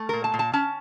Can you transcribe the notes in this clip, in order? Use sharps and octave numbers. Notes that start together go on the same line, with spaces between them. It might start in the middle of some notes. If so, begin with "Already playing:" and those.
Already playing: A3
A#2 A#4
A5
A#2
A5
C#4 A5